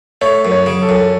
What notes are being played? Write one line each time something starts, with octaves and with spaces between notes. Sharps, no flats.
A3 C#5
F#2
C#5
C#3
A4
F#2